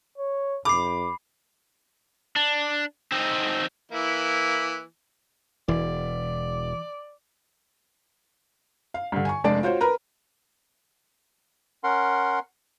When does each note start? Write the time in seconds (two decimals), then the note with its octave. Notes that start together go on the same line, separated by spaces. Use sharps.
0.18 C#5
0.65 F2 B5 D6 C7
2.36 D4
3.12 C4 D#4
3.92 E3 A#3 E4
5.68 E1 E3 D5
8.94 F5
9.12 G2 D3
9.25 G#5 C#6
9.44 F1 G#3 D4 D5 A5 D7
9.63 F4 F#4 C5 C#5
9.81 A#4 B4 A#5
11.84 C#4 A#4 F#5 C6